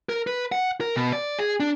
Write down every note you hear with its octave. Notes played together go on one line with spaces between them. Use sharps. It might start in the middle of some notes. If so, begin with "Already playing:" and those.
A#4
B4
F#5
A#4
B2
D5
G#4
D4